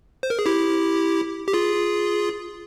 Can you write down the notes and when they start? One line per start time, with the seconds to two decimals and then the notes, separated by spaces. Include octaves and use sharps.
0.23 C5
0.30 A#4
0.39 G#4
0.46 E4 G4
1.48 G4
1.53 F4 G#4